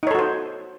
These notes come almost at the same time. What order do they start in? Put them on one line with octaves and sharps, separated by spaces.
D#4 C#5 A4 F#4 C5